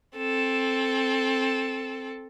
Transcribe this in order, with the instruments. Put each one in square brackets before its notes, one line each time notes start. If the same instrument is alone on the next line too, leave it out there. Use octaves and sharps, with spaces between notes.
[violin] C4 A4